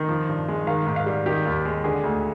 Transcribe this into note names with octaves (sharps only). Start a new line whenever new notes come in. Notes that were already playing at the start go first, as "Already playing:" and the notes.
Already playing: D#3
F3
G2
G#3
D#3 F5
G#2
F5
G3
D#3 G4
D#2
G#3
D3 G#4
D2